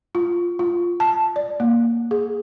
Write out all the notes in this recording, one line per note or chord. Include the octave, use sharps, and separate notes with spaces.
F4
F4
A5
D5
A#3
G#4